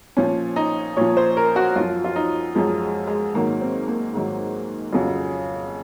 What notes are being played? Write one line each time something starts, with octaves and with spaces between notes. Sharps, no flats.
A#2 F3 C#4
D#4
A#2 F3 C#5
C5
A#4
F#4
F#2 F3 F4
F4
D#4
F#2 F3 G#3
G#3
G#3
G#2 D#3 F#3 A#3
C4
A#3
G#2 D#3 F#3
F2 C#3 F#3